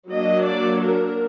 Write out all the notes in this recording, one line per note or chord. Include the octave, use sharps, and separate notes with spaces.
F#3 A#3 D4 D#5
D5
A#4